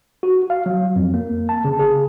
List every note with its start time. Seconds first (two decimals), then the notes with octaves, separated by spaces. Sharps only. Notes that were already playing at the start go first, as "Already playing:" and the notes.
0.23 F#4
0.50 F5
0.66 F#3
0.96 F2
1.14 A#3
1.49 A5
1.64 C#3
1.79 G#4